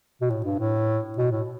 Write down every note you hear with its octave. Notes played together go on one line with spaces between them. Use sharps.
B2
A2
G2
A2
B2
A2